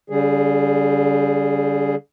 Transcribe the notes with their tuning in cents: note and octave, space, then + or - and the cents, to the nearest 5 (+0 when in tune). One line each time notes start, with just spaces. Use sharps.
D3 -45 G3 +0 G#4 +0